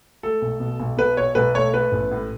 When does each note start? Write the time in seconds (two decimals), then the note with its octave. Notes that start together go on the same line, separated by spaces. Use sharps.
0.23 A3 A4
0.42 B1
0.60 B2
0.80 B1
0.98 B2 B4
1.17 B1 C#5
1.35 B1 B4
1.55 A3 C#5
1.73 B3 B4
1.92 A1
2.11 A2